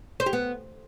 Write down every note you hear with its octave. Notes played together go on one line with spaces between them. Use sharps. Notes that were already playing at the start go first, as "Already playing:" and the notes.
C5
G4
B3